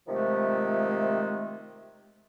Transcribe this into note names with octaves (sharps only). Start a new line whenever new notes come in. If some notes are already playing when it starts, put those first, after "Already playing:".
C3 D#3 F3 G#3 A3